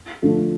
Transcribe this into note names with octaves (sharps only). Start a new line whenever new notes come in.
D3 F3 A3